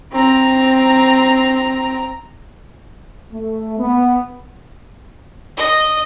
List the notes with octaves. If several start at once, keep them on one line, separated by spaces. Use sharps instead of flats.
C4 A#5
A3
B3
D#5